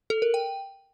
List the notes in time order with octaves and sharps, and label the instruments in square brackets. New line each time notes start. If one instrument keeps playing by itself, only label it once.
[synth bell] A4
A#4
G5